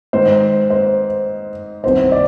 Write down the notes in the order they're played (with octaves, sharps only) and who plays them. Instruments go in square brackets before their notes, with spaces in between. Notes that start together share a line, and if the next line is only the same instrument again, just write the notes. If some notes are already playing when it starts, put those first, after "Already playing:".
[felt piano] G#2 D#3 G#3 C5
C5
C2 C3 D#3 B3 C5
D5